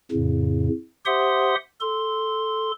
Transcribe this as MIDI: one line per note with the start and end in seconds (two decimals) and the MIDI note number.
0.12 0.68 41
0.12 0.68 45
0.12 0.68 49
1.06 1.55 67
1.06 1.55 72
1.06 1.55 76
1.06 1.55 78
1.06 1.55 84
1.06 1.55 87
1.81 2.72 69
1.81 2.72 84